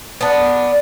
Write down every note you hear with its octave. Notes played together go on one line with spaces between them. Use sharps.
B3 D4